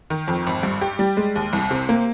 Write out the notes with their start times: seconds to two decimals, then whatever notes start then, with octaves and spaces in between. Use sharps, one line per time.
0.10 D#3
0.28 F2
0.47 G#1
0.63 G2
0.81 G4
0.99 G3
1.17 G#3
1.36 D#2
1.53 C2
1.71 C3
1.89 A#3